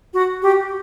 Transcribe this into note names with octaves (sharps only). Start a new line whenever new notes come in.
F#4
G4